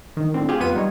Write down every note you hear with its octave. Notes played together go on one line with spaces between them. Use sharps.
D#3
A2 D3 C4
F4 G4 G#4
F2 B3 F4 B4 D#7
G3 D#4 C#5